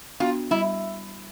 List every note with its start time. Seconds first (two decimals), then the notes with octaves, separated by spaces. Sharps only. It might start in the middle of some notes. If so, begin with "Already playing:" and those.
0.20 B3 D4 F4 F#4
0.51 G3 E4